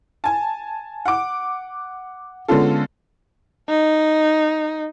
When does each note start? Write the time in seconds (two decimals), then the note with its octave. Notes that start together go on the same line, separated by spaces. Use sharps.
0.24 G#5 A5
1.05 F#5 D6
2.48 D3 G#3 B3 C#4 F4 A4
3.69 D#4